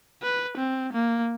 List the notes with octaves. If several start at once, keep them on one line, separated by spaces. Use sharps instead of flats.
B4
C4
A#3